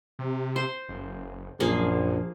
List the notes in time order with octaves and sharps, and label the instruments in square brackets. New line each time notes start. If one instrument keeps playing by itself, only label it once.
[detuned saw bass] C3
[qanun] C5
[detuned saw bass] F#1
[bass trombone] A#1 [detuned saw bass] F#2 [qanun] F3 A#3 G#4